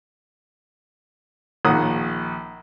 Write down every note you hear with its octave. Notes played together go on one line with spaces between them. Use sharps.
A#1 D#3 F#5 D#6